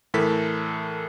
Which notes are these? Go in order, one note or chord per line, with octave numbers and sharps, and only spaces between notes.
A2 E3 A4 A#4 B6